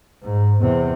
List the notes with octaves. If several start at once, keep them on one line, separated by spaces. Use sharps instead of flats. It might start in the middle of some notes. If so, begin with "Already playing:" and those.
G#2
E2 C3